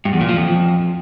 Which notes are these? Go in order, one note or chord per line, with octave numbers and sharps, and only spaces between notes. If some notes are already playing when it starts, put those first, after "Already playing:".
G2
E2
A#2
F3
F2